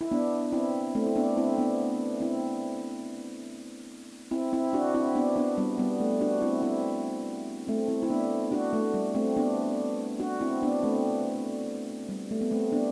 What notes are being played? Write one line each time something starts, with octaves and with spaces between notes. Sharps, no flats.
E4
B3 D4
C4 E4
A3 C4
E4
B3 D4
C4 E4
B3 D4
C4 E4
C4 E4
C4 E4
D4 F#4
C4 E4
B3 D4
B3 D4
G3 B3
G3 B3
A3
D4 F#4
C4 E4
C4 E4
A3 C4
C4 E4
E4
B3 D4
D4 F#4
A3
G3
A3 C4
B3 D4
D4 F#4
C4 E4
B3 D4
A3 C4
G3
A3
B3
A3 C4
B3 D4